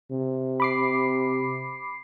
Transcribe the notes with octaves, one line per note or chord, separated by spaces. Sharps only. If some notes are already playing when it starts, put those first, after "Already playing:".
C3
B5 D6 C7